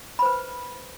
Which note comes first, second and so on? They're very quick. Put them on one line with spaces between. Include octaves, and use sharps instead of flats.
B5 C5 B4